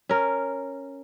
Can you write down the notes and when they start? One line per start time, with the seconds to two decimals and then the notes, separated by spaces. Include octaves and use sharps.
0.09 C#4 A#4